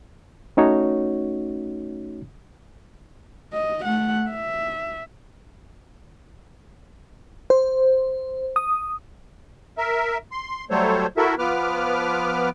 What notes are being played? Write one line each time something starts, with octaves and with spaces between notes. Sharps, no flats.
A3 C#4 D#4 F#4 C#5
D#5
A3 F#5
E5
C5
D#6
A#4 E5
C6
F#3 G3 A3 A4 C5 C#5
E4 F#4 A4 A#4 E5
F3 B3 B4 D6 F6